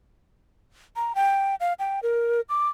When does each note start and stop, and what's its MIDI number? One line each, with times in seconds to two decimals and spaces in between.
0.96 1.15 82
1.15 1.55 79
1.60 1.73 77
1.79 2.00 79
2.03 2.41 70
2.49 2.69 86